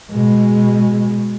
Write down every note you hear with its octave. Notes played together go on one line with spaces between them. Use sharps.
B2 G#3